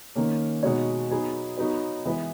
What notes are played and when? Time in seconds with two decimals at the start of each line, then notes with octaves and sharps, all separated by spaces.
0.16 D#3 A#3 C#4
0.63 B2 G#3 D#4 F#4 C#5
1.11 F#3 B3 D#4 G#4
1.57 F#3 B3 D#4 F#4 B4
2.05 E3 G#3 B3 E4 B4